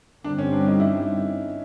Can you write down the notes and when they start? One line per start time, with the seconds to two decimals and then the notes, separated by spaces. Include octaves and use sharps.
0.24 G2 D3 G3 C4 D4
0.38 C#4
0.53 D4
0.66 D#4
0.80 E4